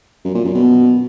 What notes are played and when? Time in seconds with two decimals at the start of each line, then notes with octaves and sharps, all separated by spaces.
0.25 F#2
0.35 A#2
0.45 F#2
0.55 B2